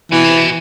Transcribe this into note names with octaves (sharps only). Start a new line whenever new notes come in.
B2 E3
C3
B2